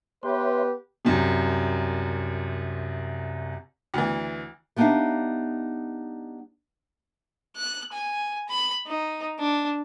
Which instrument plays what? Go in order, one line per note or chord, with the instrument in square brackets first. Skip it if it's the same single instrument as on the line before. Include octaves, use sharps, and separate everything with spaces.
[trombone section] B3 G4 B4 [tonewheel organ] C#5 E5 C6
[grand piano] C2 F#2 C3
[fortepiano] D2 E3
[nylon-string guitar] G3 B3 D4 D#4 E5 F5
[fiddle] F#6
G#5
B5
D#4
D4